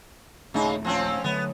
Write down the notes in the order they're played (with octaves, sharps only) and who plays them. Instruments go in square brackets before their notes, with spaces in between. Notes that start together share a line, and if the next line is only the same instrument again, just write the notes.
[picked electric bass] D#1 A3 [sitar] C#3 D#4
[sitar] F3 C4 C#4
[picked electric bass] D3 F#3 A3 [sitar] B3